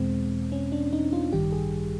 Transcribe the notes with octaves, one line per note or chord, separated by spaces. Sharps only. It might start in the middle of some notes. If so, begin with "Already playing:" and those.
Already playing: E2 B2 G#3 C4
C#4
D4
D#4
F4
A1 G2 D#3 G3 G4
G#4